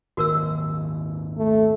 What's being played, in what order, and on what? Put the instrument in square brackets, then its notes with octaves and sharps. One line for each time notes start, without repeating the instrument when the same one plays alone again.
[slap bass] G#1 D#2 A#2 [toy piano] F#4 A#4 E6
[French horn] A3